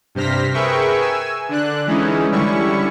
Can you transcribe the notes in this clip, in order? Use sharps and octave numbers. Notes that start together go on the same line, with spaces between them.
G2 C3 C5 F6 A#6 B6
G#4 A#4 B4 E5 G5 C#6
G#5 E6
D3 D4 F#6
E3 G#3 C#4 D#4 E4
D3 G3 C#4 E4 C#6